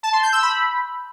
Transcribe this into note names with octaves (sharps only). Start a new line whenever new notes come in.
A5
C6
G6
E6
B5